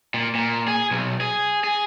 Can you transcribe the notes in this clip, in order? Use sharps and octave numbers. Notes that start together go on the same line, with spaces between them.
A#2
A#2
G#4
B1
G#4
G#4